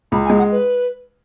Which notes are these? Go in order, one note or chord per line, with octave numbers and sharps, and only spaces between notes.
C#2 B5
G#5
G#3
F#5
B4